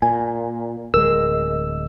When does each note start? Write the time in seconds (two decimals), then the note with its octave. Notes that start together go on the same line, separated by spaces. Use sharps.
0.02 A#2 G#5
0.94 D1 G#3 A#4 E6